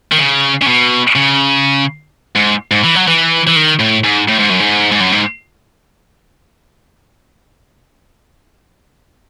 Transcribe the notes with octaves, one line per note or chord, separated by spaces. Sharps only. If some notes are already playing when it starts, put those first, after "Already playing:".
D#3
C#3
C#3
B2
C#3
G#2
G#2
E3
F#3
E3
E3
D#3
A2
G#2
A2
G#2
F#2
G#2
G#2
F#2
G#2